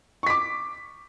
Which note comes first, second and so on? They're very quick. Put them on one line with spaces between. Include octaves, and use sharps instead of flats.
C#6 B6 D6